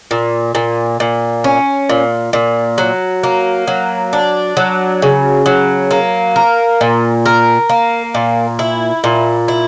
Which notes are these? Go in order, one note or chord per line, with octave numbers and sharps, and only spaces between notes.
A#2
A#2
A#2
C#4
A#2
A#2
F#3
A#3
F#3
D4
F#3
C#3
F#3
A#3
A#4
A#2
A#4
A#3
A#2
E4
A#2
E4